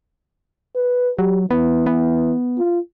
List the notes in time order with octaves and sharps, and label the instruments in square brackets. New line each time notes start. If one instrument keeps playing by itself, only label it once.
[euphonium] B4
[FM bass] F#3 [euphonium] G4
[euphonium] E3 [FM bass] B3
[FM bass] B3
[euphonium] F4